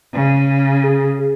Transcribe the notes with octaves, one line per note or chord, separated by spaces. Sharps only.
C#3
G#4